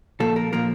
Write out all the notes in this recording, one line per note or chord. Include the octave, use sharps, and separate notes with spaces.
A#2 F3 A#3 A4
A#4
A#2 F3 A#3 A#4